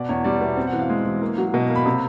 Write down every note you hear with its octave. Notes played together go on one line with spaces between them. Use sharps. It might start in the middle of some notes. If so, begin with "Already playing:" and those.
Already playing: B2 D5
E2 C#5
G3 D5
B2 E5
C4
F#5
E3
F5
G#3
E3
A#3
F#3
B2 D#5
A#3
B5
C3